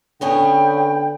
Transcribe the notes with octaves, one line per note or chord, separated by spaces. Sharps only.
D3 B3 C#4 G#4 G5